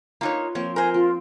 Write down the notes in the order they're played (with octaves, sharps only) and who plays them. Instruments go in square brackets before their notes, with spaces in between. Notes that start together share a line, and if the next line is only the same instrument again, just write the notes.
[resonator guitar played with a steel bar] A#3 D#4 C#5 [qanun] F4 B4
[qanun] F3 A#3 C4 [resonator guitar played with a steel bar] C#5
[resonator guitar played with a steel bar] A#4 C5 [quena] G#5
[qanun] C4 [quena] F4